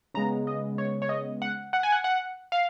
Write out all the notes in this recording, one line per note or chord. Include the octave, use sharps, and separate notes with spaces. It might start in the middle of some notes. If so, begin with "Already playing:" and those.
C#3 G#3 B3 A#5
D#5
C#5
C#5
D#5
F#5
F#5
G#5
F#5
F#5
F5